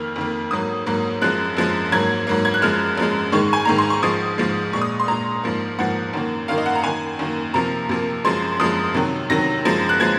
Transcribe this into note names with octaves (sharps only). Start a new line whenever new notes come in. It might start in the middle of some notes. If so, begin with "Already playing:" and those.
Already playing: F2 D#3 A#3 F6
F2 D#3 A#3
G#2 F#3 A#3 D#6
G#2 F#3 A#3
F#2 F3 G#3 F#6
F#2 F3 G#3
G#2 F#3 A#3 G#6
G#2 F#3 A#3
G#6
F#6
F#2 F3 G#3 F6
F#2 F3 G#3
G#2 D#3 G#3 C#6
G#5
G#2 D#3 G#3 A#5
C6
C#6
G#2 F3 G#3 D#6
G#2 F3 G#3
A#2 G#3 C#6
D#6
C6
A#2 G#3 A#5
G#2 F3 A#3
G#2 F3 A#3 F#5
F#2 D#3 A#3
F#2 D#3 A#3 F5
D#5
F#5
A#5
F#2 D#3 A#3 G#5
F#2 D#3 A#3
C3 F3 A#3 A#5
C3 F3 A#3
F#2 F3 G#3 C6
F#2 F3 G#3 D#6
C3 D#3 F#3
C3 D#3 F#3 A#6
F#2 F3 G#3
F#6
F3 G#3 G#6